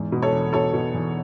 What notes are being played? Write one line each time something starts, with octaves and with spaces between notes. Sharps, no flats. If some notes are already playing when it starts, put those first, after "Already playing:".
Already playing: E2 G#2
B2
A4 C#5
E2
B2 A4 C#5
B2
E2